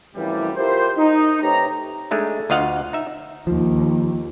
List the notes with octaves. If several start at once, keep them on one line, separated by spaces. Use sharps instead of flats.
F#2 A2 C3 E3 F3 G3
E4 F4 G4 A#4 C5
D#4
C3 A3 G4 B4 C#5 A#5
G#3 A3 D4 D#4
D2 F4 D#5 F5 F#5
D#4 E5
D#2 F3